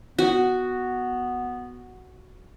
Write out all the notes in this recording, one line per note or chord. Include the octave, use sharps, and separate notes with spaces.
B3 F#4